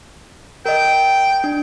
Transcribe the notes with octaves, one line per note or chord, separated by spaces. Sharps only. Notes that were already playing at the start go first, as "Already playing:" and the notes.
A#4 D#5 G5
D4